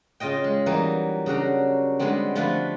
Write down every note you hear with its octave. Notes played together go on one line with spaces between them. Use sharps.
C#3 F4 D#5 G5
G#3
E3 F#3 G3 A#3 D#4
C#3 D4 F#4 A#5
D3 G3 G#3 B3 C4
D3 F3 A3 F4 B4